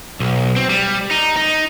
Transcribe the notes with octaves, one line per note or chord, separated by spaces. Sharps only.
B1
C4
G3
D#4
D#4